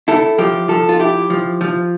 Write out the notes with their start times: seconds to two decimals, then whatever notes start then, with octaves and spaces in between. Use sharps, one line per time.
0.08 E4 A4
0.38 F3 G4
0.68 F3 A4
0.89 F4
1.00 E4 G4
1.30 F3
1.61 F3